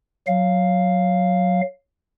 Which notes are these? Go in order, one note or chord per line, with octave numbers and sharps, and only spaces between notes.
F#3 F5